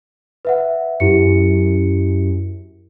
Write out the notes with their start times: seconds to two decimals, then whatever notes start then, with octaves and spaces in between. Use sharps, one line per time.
0.45 B4 E5 F#5
1.00 F#2 E4 G4 C#7